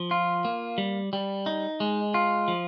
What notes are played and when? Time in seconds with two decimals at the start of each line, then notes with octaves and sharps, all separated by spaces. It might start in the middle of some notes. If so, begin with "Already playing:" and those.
Already playing: F3
0.11 F4
0.45 A#3
0.78 G3
1.13 G3
1.46 D#4
1.80 G#3
2.14 F4
2.48 F3